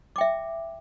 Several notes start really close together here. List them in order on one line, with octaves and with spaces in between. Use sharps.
D6 G5 E5